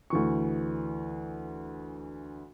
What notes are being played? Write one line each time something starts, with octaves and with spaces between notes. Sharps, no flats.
D2 E3 C#6